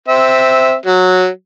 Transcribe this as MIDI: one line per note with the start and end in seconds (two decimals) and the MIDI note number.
0.08 0.74 60
0.08 0.74 76
0.86 1.28 54